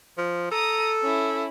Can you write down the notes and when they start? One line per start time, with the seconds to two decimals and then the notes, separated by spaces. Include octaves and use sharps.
0.18 F3
0.51 A4 A#5 D#6
1.03 C#4 E4